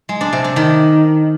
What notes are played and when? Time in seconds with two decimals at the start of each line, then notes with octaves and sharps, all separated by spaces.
0.09 G#3
0.21 D4
0.33 C3
0.44 D4
0.56 D#3